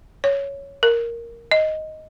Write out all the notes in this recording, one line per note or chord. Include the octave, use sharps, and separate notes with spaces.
C#5
A#4
D#5